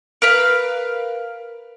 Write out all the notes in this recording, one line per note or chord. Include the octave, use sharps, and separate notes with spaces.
A#4 B4 F5